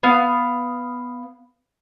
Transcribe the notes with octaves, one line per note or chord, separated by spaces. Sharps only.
B3 F5